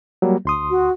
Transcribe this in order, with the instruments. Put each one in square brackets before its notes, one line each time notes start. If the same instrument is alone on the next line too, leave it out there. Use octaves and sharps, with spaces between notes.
[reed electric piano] F#3 G3 A#3
D2 C6 D#6
[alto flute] F#4